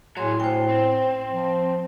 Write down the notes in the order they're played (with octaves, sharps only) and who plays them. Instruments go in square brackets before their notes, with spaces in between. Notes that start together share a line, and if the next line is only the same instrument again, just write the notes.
[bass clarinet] A2 [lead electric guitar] F#3 G#4 [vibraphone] C#5 C6
[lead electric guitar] D2 [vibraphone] C5 G5
[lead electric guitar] C4
[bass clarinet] F3